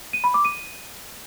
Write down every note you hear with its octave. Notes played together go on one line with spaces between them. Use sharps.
D#7
B5
D6
D#7